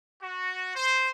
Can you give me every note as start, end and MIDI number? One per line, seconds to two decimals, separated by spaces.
0.21 0.73 66
0.75 1.09 72